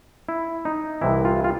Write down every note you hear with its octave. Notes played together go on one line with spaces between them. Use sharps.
E4
D#4
C2 C3 E3 E4
F4
F4